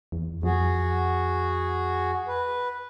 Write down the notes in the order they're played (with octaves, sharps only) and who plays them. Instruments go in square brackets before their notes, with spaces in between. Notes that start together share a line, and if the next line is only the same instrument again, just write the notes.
[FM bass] E2
[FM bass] F2 [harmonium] F#4 G#4
[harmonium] B4